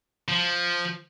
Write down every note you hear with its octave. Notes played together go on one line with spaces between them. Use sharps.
F3